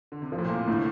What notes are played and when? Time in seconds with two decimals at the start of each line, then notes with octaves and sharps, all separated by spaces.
0.12 D3
0.22 C3
0.32 A#2 F3
0.38 A2
0.45 A#2 A#3
0.56 C3
0.68 A2 D3